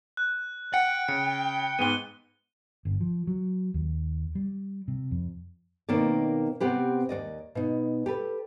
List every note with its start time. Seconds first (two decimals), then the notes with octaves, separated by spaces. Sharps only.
0.17 F#6
0.74 F#5 G5 C#7
1.08 C#3 C#7
1.79 G#2 G#3 B3 D#7 G7
2.85 G1
3.01 F3
3.27 F#3
3.74 D#2
4.35 G3
4.88 C3
5.11 F2
5.89 B2 D#3 A#3 C4 C#5 D5
6.60 C3 B3 C4 G4 B4
7.09 D#2 F3 D5 D#5
7.55 B2 D#4
8.06 G4 A4 B4